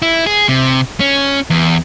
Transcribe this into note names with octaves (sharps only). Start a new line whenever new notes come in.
E4
G#4
C3
C#4
E2